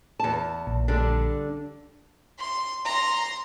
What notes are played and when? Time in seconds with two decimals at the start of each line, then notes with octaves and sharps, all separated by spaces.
0.19 E2 A5
0.67 A#1
0.88 D3 G3 D4
2.39 C6
2.85 A#5 C6